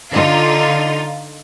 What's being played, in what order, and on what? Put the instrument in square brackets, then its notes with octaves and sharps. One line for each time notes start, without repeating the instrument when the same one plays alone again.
[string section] D3 D#4 F4